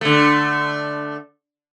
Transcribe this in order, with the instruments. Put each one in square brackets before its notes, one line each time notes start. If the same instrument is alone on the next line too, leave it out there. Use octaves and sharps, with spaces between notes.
[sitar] D3 A3